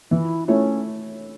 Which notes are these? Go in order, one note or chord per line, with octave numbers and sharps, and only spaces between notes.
E3 E4
A3 C#4 E4 C#5